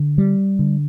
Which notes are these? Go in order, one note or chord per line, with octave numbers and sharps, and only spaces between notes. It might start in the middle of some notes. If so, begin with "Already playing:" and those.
Already playing: D3
G3
D3